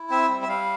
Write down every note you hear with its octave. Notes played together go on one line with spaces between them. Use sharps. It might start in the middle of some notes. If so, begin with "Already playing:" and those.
Already playing: E4
C4 E5
G3
E5
G3 F5